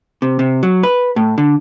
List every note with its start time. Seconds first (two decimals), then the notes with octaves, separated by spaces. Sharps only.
0.22 C3
0.39 C3
0.63 F#3
0.83 B4
1.16 A2
1.38 D3